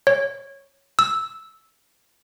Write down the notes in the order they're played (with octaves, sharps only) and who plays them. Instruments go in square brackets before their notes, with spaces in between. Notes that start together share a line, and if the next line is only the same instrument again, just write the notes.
[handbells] C#5
E6